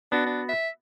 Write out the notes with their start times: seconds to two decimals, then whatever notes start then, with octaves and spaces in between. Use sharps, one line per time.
0.12 B3 D4 F#4
0.26 D4
0.49 E5